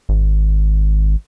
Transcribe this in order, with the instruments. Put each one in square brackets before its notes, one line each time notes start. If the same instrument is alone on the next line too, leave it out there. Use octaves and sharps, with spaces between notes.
[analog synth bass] G#1